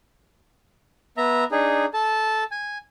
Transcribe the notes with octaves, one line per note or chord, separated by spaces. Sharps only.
B3 E5 A#5
D4 D#4 G#4
A4 A5
G#5